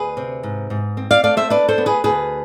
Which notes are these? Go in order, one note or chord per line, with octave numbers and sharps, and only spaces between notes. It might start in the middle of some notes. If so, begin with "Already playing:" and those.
Already playing: D2 G#4 B4
C3
G#2
G#2
C4
D5 F5
A3 D5 F5
C5 E5
D4 B4 D5
A4 C5
B3
G#4 B4
D2 G#4 B4